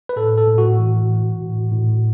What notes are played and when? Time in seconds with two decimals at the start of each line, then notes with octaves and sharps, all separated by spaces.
0.09 B4
0.16 A2 A4
0.37 A4
0.48 A2
0.58 F#4
0.79 E3
1.09 E3
1.42 A2
1.72 A2